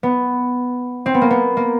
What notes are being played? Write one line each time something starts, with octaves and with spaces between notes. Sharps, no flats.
B3
C4
B3
A#3
B3
A#3